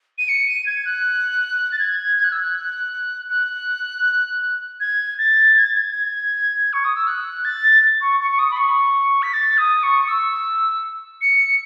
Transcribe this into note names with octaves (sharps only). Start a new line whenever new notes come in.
D#7
C#7
D#7
G#6
F#6
A6
G#6
G#6
F#6
E6
F#6
F#6
G#6
A6
G#6
A6
G#6
C#6
D#6
E6
F#6
A6
C#6
C#6
C#6
D#6
B5
C#6
B6
A6
D#6
C#6
E6
C#7